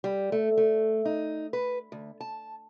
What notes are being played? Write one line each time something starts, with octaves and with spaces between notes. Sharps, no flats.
G3
A3
A3
D#4
B4
D2
A5